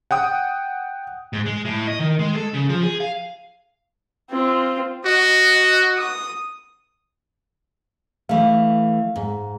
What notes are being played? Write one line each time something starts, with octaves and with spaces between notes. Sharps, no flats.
F#5 G5 D#6
G#2
G#3
A2
D#5
D#3
G#3
A4
C#3
F3
G#4
F5
C4 F4
F#4 D#5
D#6
E3 A3 F5
G#2